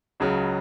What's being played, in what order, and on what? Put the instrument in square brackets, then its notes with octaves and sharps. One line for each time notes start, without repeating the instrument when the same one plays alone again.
[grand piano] C#2 C#3 F#3